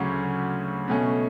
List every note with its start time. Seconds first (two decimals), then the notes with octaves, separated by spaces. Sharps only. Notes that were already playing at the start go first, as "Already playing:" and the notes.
Already playing: D2 C#3 F#3 C#4
0.88 B2 A3 C#4